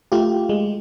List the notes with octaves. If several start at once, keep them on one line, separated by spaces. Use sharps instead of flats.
A3 F4 G4
G#3